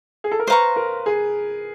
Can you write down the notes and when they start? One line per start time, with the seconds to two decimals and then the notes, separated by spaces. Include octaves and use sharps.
0.24 G#4
0.31 A4
0.39 A#4
0.47 B4 C5 F5 A#5 C#6
0.76 A#4
1.06 G#4